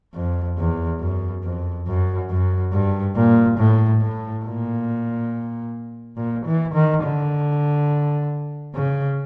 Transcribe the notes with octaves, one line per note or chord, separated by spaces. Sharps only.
F2
E2
F#2
F2
F#2
F#2
G2
A#2
A2
A2
A#2
A#2
E3
D#3
D3
C#3